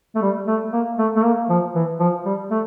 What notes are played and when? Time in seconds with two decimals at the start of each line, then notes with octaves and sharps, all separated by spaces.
0.15 A3
0.22 G3
0.47 A3
0.73 A#3
0.98 A3
1.16 A3
1.24 A#3
1.50 F3
1.75 E3
2.00 F3
2.25 G3
2.51 A3